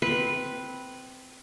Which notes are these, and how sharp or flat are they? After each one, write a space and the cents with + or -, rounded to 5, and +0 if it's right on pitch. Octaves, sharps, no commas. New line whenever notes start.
C4 -15 B4 -5